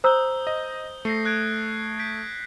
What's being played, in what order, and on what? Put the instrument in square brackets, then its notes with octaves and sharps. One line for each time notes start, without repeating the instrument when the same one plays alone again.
[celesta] C5 A#5 E6 [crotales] D#6 G6 G7
[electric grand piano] D#5
[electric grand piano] A3 [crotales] A#6 C7 C#7
[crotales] F#6 G#6 D7
G6 B6 D7